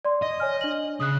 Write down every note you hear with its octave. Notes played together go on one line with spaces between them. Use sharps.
D5 C6
D#5
C#5 G#5 F6
D4 F#7
C#3 D#6 F#6